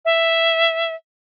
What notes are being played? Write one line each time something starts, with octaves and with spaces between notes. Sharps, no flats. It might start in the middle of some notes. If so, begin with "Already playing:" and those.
E5